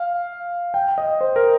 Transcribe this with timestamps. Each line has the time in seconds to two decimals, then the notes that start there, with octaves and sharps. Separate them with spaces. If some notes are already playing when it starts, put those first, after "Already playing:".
Already playing: F5
0.74 G5
0.98 D#5
1.21 C5
1.36 A#4